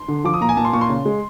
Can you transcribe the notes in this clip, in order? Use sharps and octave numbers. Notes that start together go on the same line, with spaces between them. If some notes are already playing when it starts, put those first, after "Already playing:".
Already playing: C6
D3
F3 D6
D#6
A#2 A#5
G#5
A#2 A5
C6
A#2 C#6
C6
C#3
G#3